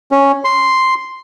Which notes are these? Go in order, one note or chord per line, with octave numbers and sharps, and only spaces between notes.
C#4
C6